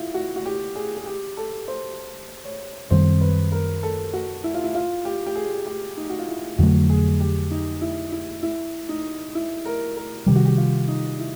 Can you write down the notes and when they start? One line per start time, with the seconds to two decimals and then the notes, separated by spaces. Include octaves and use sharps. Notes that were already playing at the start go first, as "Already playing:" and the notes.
Already playing: E4 F4
0.14 F#4
0.36 F#4
0.46 G4
0.75 G#4
0.97 G#4
1.06 G4
1.37 A4
1.68 C5
2.44 C#5
2.90 F#2 D#3 G3 C4 C5
3.21 B4
3.52 A#4
3.83 A4
4.13 F#4
4.44 E4
4.54 F4
4.64 E4
4.75 F4
5.05 G4
5.26 G4
5.36 G#4
5.66 G4
5.97 D#4
6.10 F#4
6.19 F4
6.28 E4
6.58 F2 D3 F#3 A3 F#4
6.90 G#4
7.20 G4
7.51 D#4
7.81 E4
8.12 E4
8.43 E4
8.89 D#4
9.35 E4
9.65 A#4
9.96 A#4
10.27 C3 D#3 G3 G4
10.36 F#4
10.45 G4
10.57 F4
10.88 D#4
11.19 E4